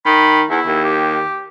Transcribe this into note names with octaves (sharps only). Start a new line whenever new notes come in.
D#3 B5
E2 E4
D#2
G4